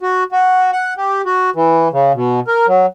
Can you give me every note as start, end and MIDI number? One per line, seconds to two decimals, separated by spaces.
0.01 0.24 66
0.32 0.71 66
0.72 0.94 78
0.97 1.22 67
1.26 1.50 66
1.56 1.88 52
1.92 2.12 49
2.14 2.40 47
2.47 2.66 70
2.68 2.86 54